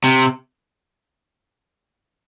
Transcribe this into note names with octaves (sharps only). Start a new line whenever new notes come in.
C3